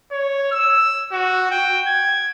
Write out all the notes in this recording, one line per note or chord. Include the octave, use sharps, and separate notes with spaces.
C#5
E6
F#4
G5
G#6